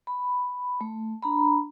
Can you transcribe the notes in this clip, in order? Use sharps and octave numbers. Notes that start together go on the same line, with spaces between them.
B5
A3
D4 A#5 B5